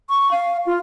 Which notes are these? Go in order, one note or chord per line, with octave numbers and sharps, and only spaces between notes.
C#6
F5
F4